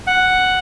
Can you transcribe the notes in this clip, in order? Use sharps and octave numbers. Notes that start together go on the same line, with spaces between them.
F#5